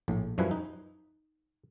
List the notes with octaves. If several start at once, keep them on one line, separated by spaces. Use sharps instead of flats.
A#1 A2
F#2 F3 G3 E4 B4 G#5
D#4